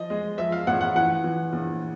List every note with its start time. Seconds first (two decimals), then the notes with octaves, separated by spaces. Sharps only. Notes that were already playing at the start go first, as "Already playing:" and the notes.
Already playing: F3 D#5
0.10 G#3
0.38 F3 E5
0.52 F5
0.67 A1 F#5
0.81 F#5
0.95 E3 F#5
1.24 E3
1.53 A#1